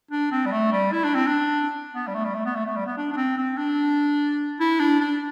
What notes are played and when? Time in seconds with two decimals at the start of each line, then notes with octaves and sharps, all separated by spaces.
0.11 D4
0.32 C4
0.46 G3
0.52 A3
0.72 G3
0.92 E4
1.04 D4
1.15 C4
1.27 D4
1.95 B3
2.08 G3
2.15 A3
2.25 G3
2.35 A3
2.46 B3
2.56 A3
2.66 A3
2.76 G3
2.86 B3
2.97 D4
3.12 D4
3.17 C4
3.38 C4
3.57 D4
4.60 E4
4.80 D4
5.00 D4